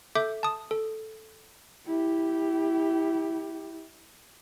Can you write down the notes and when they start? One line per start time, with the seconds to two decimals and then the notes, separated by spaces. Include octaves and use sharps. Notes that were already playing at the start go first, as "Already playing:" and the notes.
0.15 A4 E5 D6 G6
0.43 A5 D#6
0.71 A4
1.86 E4 G4